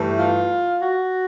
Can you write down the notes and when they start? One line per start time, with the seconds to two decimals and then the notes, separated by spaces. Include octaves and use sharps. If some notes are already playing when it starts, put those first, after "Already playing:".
Already playing: G2 E3 A3
0.19 F4
0.80 F#4